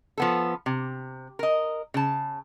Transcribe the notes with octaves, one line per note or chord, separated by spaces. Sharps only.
F3 B3 A4
C3
A#4 D#5
C#3 A5